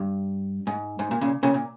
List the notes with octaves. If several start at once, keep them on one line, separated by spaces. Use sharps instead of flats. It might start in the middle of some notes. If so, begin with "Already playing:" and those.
Already playing: G2
G#2
G#2
A#2
A#2 C#3
A#2 C#3
A#2